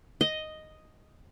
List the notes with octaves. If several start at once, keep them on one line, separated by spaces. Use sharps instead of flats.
D#5